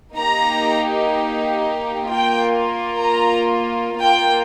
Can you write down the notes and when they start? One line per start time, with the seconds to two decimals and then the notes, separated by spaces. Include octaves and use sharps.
0.17 A#3 D#4 G4 A#5
2.10 A#3 F4 G5
3.05 A#5
4.02 A#3 F4 G5